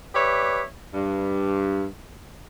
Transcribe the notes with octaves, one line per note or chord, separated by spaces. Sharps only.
G4 B4 C#5 D5 E5
G2